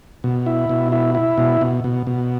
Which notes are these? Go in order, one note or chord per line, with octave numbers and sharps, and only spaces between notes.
B2
E4
B2
E4
E4
B2
B2
B2
B2